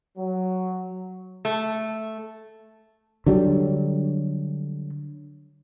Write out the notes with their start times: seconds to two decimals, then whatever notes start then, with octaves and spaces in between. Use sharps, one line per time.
0.18 F#3
1.45 A3
3.26 D3 F#3 G3